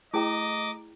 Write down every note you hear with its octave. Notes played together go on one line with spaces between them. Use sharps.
A3 E4 G#4 D#5 G5 A#5 D6